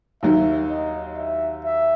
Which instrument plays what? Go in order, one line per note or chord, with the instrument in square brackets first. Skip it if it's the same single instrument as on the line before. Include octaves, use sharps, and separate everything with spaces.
[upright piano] D#2 D#3 F#3 [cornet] E5
[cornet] D#5
E5
E5